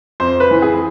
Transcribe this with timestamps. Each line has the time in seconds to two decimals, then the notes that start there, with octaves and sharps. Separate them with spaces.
0.20 F2 C5
0.40 B4
0.51 E3
0.62 G#4